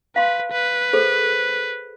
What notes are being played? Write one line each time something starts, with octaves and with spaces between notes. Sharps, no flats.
B4 F5 C6
B4
G#4 A4 C5